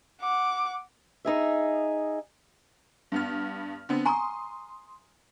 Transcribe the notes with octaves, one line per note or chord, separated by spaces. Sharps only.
F#5 D6
D#4 G#4 E5
G2 B3 F6
D3 B3 C4
G#5 A#5 C6 C#6 D#6